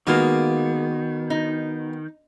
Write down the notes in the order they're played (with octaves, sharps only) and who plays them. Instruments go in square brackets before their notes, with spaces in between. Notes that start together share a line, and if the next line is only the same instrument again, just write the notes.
[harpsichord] B2 [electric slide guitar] D#3 [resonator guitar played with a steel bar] G#3 A#3 F4
[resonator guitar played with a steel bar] D#4